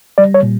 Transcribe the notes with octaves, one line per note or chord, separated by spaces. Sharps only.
G3 D5
C#5
A#2